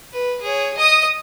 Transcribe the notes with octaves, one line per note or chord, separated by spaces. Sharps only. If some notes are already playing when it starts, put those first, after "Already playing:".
B4
G#4 C#5
D#5 D#6